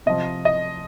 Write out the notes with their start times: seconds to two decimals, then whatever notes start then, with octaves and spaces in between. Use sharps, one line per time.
0.06 C3 F3 D#5
0.45 D#5